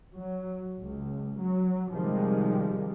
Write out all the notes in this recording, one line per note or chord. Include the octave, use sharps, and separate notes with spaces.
F#3
C#2
F#3
C3 D#3 F3 G3 G#3